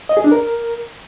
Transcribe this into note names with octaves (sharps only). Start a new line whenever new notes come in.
D#5
G#4
D4
A#4